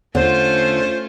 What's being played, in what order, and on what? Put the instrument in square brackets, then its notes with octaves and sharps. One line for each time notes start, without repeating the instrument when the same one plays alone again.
[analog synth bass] E2 [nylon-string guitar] D3 [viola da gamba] A3 C#4 F4 [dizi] C5